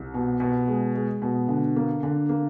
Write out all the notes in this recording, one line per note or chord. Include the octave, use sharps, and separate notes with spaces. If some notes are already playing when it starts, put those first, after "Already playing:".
Already playing: C2
B2
B2
G#3
G#3
B2
D3
A#3
D3
A#3